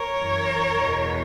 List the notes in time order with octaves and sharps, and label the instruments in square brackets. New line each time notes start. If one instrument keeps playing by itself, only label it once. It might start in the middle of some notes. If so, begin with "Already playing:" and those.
Already playing: [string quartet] A#4 C#5
F#2 E3
E2 B2